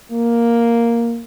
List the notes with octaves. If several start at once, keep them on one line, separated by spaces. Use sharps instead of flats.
A#3